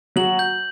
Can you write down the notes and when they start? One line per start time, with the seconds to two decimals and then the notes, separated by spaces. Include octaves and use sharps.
0.16 F#3 F#4 F#7
0.39 G6